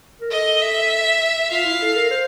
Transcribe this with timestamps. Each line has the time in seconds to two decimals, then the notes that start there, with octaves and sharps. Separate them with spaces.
0.21 A#4
0.31 A4 D#5
0.61 E5
1.51 F4 F5
1.65 E4
1.82 A4
1.96 A#4
2.11 C5